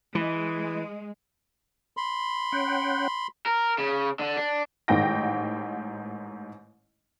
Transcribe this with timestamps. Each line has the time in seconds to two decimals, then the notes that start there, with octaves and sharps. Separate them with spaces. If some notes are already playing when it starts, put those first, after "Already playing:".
0.15 E3 G#3
1.97 B5 C6
2.52 C#4 F#5 G5
3.46 A#4
3.78 C#3
4.19 D3
4.37 D4
4.88 A1 G#2 D#3 G5 A#6